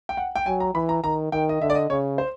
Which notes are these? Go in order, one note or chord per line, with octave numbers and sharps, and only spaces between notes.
G5
F#5
G5
F#3 G#5
A#5
E3 B5
A#5
D#3 A#5
D#3 G5
D#5
D3 E5
D5
D#5
C#3 C#5
C5